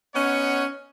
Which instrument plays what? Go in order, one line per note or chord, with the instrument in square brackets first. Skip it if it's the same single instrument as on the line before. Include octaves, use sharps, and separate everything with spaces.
[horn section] B3 C#4 D#4 C#5 F#5